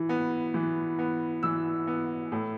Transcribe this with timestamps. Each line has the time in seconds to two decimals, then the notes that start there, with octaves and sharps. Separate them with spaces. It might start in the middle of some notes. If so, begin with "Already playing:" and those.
Already playing: E3
0.09 B3
0.54 E3
0.99 B3
1.43 E3 E6
1.87 B3
2.32 A2